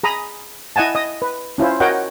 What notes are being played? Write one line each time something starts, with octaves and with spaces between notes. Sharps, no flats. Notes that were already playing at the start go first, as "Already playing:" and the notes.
G#4 A#5 B5 D#6
E4 D#5 F#5 G#5 A5
D#5 D#6
B4
C#4 E4 F4 C5
F#4 A#4 C#5 D#5 F#5 G5